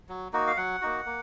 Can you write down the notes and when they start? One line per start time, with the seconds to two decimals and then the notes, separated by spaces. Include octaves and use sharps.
0.09 F#3
0.33 A#3 D#4 F#4
0.47 F5
0.57 F#3 F#5
0.81 A#3 D#4 F#4
1.06 A#3